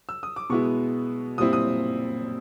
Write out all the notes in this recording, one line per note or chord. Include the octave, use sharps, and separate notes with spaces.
E6
D#6
D6
B2 G#3 B3 E4 C#6
A#2 G3 C4 E4 D#6
D#6